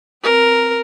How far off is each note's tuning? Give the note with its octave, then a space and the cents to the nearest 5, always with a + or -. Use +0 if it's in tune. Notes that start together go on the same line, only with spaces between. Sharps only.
C4 +0 A#4 +0